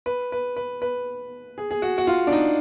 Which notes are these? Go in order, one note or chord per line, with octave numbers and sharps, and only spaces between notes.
B4
B4
B4
B4
G#4
G#4
F#4
F#4
F4
D4
D#4